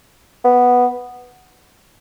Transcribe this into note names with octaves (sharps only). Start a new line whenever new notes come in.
B3